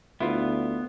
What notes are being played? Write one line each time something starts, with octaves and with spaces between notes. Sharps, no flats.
D2 B3 E4 F4